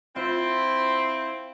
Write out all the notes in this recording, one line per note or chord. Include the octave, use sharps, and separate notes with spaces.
C4 E4 F4